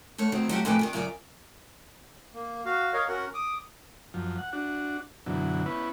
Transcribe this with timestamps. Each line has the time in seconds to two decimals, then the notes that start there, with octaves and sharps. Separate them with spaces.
0.18 E2 A3 C#5
0.32 B2 D#3 F#3 C4
0.49 F#3 A3 C#4 E4 F#4 G4
0.65 F2 A2 E3 B4 G5
0.79 C3 D#3 D4
0.93 F#2 C#3 F4 F#4 D5
2.34 A#3
2.65 F#4 F5
2.94 A#4 C#5 D#5 F5
3.08 C#4 F#4 A#4 F#5
3.34 D6 D#6
4.14 F#2 F3
4.38 F#5
4.53 D4 F#4
5.26 F#2 B2 D3 E3 F#3
5.66 B3 C#4 E4 B4